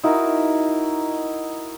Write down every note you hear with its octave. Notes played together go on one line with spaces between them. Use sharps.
D#4 E4 F#4 A#4